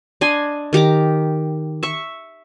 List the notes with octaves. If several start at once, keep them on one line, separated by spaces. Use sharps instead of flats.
D4 D#5 G#5 C6
D#3 G4 A#5 D6
E5 C#6